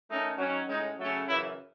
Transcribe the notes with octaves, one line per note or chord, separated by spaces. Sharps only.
D#3 A3 C#4 D#4
D#3 F#3 C#4
A2 G#3 C#4 D#4
C#3 F#3 A3 C#4
F#2 C#3 E3 E4